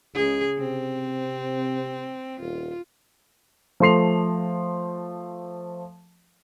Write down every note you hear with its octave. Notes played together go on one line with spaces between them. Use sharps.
C#2 C#3 G#4
C3 C4
D#1 F4
F3 A3 C6 C7 F7